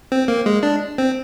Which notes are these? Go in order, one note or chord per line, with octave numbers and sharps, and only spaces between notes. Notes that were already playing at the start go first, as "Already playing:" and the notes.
C4
A#3
G#3
D4
C4